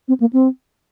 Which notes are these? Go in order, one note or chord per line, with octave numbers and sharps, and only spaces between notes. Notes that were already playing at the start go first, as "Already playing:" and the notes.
C4
A#3
C4